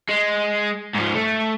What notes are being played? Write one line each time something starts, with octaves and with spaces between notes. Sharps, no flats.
G#3
G#2 F3
A3